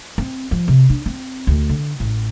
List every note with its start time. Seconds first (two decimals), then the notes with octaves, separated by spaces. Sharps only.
0.18 C4
0.51 F3
0.68 C3
0.90 D4
1.06 C4
1.47 D2
1.69 D3
2.00 A1